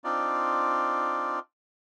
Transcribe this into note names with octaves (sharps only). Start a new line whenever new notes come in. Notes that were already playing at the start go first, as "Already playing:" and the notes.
C4 D4 D#4 F4 D5